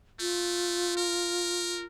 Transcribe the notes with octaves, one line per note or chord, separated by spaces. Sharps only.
A3 F4
A#4